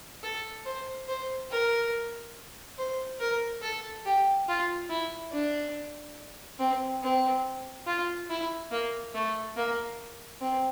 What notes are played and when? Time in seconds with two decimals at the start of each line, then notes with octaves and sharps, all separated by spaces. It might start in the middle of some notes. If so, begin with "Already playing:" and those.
0.23 A4
0.66 C5
1.08 C5
1.51 A#4
2.79 C5
3.20 A#4
3.62 A4
4.06 G4
4.48 F4
4.90 E4
5.32 D4
6.60 C4
7.03 C4
7.87 F4
8.30 E4
8.72 A#3
9.15 A3
9.57 A#3
10.41 C4